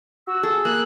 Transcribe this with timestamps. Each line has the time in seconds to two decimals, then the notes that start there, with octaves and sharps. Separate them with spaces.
0.27 F#4 E6
0.43 G#4 A4
0.65 A#3 F#6